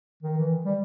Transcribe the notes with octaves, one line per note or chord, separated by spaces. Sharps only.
D#3
E3
G3